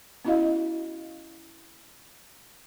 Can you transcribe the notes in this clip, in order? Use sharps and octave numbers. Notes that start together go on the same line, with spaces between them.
B3 C#4 E4 F#4 D#5 F5